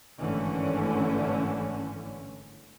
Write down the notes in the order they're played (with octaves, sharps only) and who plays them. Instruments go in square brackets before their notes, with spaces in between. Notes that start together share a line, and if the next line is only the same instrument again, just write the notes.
[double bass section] G#1 G2 D3 E3 A3 C#4